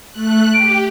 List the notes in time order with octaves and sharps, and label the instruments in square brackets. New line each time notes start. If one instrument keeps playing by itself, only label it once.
[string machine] A3 F#6
[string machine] G4 [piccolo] D7